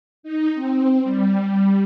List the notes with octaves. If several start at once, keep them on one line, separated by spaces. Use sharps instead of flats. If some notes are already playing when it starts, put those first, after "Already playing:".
D#4
C4
G3